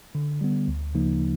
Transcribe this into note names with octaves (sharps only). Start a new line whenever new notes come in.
D3
G3 B3
D2
C#3 F3 A#3 D#4